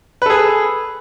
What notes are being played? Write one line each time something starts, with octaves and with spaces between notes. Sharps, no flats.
G#4 A4 B4